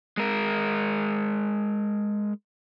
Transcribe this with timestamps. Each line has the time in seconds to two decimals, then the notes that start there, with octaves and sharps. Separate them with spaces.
0.17 G#3 A#4